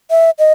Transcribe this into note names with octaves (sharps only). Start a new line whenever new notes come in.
E5
D#5